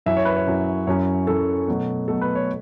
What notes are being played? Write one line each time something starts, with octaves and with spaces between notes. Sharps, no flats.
F#2 F#3 C#4 E4 E5
C#5
B4
C#5
F#2 F#3 C#4 E4
F#2 F#3 C#4 E4 C#5
F#2 F#3 C#4 E4 A4
B2 F#3 A3
B2 F#3 A3 A4
B4
C#5